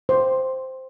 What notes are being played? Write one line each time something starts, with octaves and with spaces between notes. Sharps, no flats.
C5